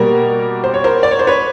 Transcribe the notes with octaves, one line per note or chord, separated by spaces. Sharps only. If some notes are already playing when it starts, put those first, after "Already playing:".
Already playing: B2 G3 A#3 A#4
C5
C#5
A#4 C5
D5
C#5
C5
B4 C#5